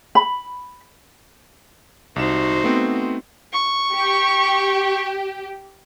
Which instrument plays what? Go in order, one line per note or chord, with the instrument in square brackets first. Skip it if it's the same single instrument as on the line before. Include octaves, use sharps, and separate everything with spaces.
[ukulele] B5
[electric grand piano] C2 E7 [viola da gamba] D#4 F#4 C5
[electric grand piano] A3 B3 C4
[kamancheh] C#6
[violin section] G4